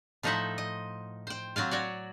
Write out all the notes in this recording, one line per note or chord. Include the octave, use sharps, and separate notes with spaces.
A2 F3 D#4 C5 E5 F#5
D#5
C5 G5
F#3 C4 F4 F5
F#4 C#5 D5